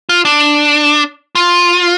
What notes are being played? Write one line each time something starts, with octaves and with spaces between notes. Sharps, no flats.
F4
D4
F4